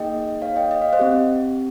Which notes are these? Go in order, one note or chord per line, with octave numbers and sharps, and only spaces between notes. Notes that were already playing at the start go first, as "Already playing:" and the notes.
Already playing: A#3 D#4 G#4 D#5 G5
C#5 F5
D#5 G5
D#5
F5
C5 D#5
C4 G4